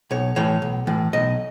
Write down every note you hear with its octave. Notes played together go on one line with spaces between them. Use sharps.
B1 C#5
A2 E3 C#5
B1
A2 E3
B1 D#5